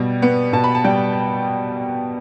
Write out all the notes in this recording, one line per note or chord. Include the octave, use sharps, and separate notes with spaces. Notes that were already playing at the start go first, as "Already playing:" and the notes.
Already playing: B2 G3
B3
B2 A5
B5
A5
G3 G5